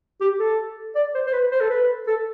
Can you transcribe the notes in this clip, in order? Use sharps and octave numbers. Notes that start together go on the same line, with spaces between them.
G4
A4
D5
C5
C5
B4
C5
A4
B4
A4